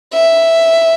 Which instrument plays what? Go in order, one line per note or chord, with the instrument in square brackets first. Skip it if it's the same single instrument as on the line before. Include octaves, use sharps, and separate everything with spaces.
[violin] E5